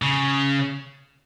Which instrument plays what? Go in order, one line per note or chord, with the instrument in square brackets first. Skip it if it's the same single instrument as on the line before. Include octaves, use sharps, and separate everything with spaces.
[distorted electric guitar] C#3